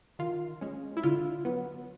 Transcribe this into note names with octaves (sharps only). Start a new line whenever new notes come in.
D#3 F4
G#3 C#4
E4
D3 F4
F#3 B3